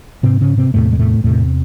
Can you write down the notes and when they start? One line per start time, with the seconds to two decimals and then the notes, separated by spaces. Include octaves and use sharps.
0.23 G#2 C3 C4
0.41 C#3 C#4
0.57 C3 C4
0.74 E2 A2 C3 A3
0.92 G#3
0.99 A2 A3
1.24 E2 A2 C3 A3